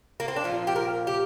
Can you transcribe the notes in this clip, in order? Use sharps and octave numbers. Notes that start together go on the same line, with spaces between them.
A#3
C4
D4
A#2 F3 F4
G4
A#4
G4